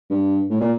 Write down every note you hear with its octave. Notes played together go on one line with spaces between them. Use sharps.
G2
A2
A#2